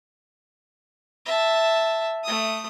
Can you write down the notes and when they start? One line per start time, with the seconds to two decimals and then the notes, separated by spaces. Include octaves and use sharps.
1.26 E5 A5
2.24 A3 D#6